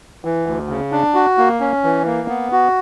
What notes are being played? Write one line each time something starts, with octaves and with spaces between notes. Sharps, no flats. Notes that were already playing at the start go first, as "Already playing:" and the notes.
E3
D2
C#3
D4
F#4
A#3
C#4
E3
A#3
B3
F#4